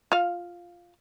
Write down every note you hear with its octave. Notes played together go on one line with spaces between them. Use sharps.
F4 F5